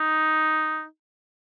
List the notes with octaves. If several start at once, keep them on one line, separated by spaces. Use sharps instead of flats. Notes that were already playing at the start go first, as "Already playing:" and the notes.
Already playing: D#4